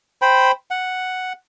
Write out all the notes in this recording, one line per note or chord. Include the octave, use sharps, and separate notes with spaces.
C5 G5 B5
F#5